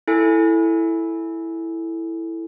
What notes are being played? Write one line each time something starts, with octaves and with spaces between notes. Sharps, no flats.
E4 A4 G#5